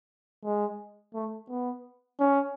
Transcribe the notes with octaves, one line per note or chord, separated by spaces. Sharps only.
G#3
A3
B3
C#4